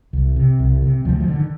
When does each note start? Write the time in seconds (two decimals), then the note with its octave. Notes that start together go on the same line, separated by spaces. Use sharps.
0.13 C2
0.36 C3
0.59 C2
0.82 C3
1.05 D2 F3
1.20 F3
1.28 D3
1.36 D#3